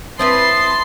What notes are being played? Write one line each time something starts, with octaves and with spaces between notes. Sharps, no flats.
C4 E4 B4 A5 C6 D#6